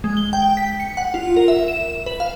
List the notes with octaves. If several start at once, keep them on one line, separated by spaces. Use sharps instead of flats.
G#3
G7
G5
B6
C#7
F#5
F4
A#4
E5
E7
B4
F5